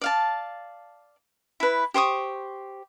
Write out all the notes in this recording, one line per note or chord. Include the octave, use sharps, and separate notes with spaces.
D5 F5 A5
E4 B4
G4 C5 C#6 D#6